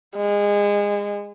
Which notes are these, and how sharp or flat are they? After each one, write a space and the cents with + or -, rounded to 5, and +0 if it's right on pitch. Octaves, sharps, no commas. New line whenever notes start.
G#3 -25